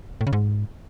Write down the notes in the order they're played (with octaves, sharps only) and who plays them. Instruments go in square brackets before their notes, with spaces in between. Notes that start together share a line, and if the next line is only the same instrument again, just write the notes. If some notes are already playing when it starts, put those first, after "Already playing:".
[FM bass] A2
C#3
G#2